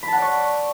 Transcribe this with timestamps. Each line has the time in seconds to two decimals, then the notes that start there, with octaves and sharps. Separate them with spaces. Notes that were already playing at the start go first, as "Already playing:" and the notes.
0.03 B5
0.08 A5
0.12 F#5
0.17 D5
0.22 C#6